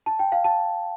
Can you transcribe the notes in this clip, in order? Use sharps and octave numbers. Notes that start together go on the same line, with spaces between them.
A5
G5
F5
A5